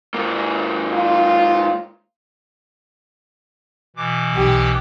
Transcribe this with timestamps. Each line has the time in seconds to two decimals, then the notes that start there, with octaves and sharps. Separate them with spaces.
0.14 G#2 A#3
0.94 F4
3.96 B2 E3 D6
4.34 B1 G4